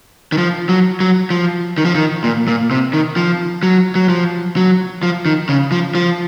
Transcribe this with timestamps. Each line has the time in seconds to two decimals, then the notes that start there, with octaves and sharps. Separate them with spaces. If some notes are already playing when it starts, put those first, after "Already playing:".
0.32 D#3
0.38 F3
0.69 F#3
1.00 F#3
1.30 F3
1.78 D#3
1.85 F3
1.95 D#3
2.24 A#2
2.48 A#2
2.71 C3
2.93 D#3
3.17 F3
3.63 F#3
3.95 F#3
4.09 F3
4.56 F#3
5.03 F3
5.26 D#3
5.49 C#3
5.72 F3
5.95 F3